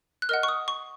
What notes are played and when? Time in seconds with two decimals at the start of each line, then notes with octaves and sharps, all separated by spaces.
0.22 F#6
0.29 A#4 D#5 F#5 F6
0.43 C#6
0.48 D#6
0.68 C#6